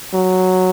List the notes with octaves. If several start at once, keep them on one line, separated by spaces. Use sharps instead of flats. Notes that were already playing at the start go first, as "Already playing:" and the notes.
F#3